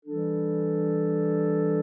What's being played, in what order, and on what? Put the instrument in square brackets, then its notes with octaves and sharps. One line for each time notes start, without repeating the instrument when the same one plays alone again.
[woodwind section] E3 G3 D4 A4